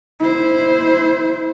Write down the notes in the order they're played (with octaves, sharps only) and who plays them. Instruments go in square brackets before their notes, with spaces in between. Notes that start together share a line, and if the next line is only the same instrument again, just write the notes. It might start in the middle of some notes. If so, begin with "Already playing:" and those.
[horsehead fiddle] E4 C5